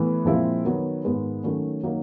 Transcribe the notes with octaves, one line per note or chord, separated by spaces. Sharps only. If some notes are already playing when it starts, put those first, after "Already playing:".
Already playing: A2 E3 B3
A#2 F3 G#3 C4 E4
D#3 F#3 B3
G#2 D#3 G#3 B3
D#3 F#3 A3 C#4
D#3 F#3 A#3 D#4